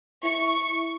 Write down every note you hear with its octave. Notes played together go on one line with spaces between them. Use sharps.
E4 C#6